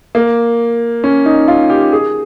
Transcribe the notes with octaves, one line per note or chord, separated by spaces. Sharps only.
A#3
C#4
D#4
F4
G4
G#4